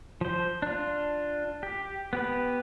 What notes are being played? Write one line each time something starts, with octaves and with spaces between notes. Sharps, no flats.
F3 C5
D4 F4
G4
B3 G4 B4